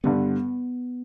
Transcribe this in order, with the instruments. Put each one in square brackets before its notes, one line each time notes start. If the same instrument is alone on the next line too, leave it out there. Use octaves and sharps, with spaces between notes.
[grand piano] G2 D3 G3 [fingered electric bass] B3